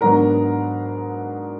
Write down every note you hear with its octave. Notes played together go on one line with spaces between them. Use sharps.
G#2 D#3 F#3 B3 D4 A#4 A#5